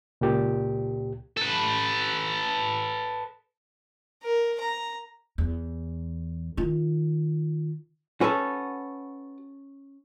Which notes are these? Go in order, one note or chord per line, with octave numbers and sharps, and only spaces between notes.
C#2 A#2 G4
A4 B4
A#4
A#5
E2
D#3 F4
C#4 F#4 A4 B4